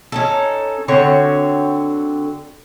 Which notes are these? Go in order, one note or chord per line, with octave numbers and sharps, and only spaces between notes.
C#4 D#4 A4
D3 C4 F#4 C#5